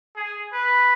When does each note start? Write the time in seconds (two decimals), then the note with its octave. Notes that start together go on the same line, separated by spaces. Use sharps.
0.16 G#4
0.53 B4